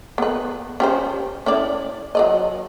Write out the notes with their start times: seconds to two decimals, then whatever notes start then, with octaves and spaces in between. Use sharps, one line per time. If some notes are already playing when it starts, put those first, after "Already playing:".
0.18 B3 B4
0.80 C#4 G4 C5
1.46 C#4 E4 D5
2.15 F#3 D5 D#5